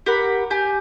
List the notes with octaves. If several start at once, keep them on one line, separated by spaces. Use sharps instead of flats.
G4 A#4 F#5 B5
G4 G#5 G6